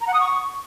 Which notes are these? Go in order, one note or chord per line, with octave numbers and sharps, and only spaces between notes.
A#5
F#5
D#6
C#6